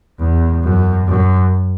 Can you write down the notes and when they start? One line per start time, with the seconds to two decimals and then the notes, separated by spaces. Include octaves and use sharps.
0.20 E2
0.63 F#2
1.07 F#2